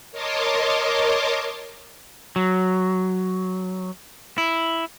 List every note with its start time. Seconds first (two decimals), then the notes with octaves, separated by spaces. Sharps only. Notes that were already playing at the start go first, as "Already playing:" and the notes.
0.11 A#4 C#5 D#5 A5 C6 D6
2.36 F#3
4.38 E4